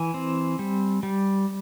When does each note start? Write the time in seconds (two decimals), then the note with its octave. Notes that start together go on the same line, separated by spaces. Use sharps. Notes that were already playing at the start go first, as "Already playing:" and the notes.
Already playing: E3 G#5
0.14 C4
0.59 G3
1.03 G3